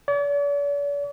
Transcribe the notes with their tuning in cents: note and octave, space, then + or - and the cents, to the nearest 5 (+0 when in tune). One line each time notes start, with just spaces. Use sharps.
D5 -45